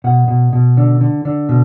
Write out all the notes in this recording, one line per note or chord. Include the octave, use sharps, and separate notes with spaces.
B2 F#5
B2
B2
D3
D3
D3
B2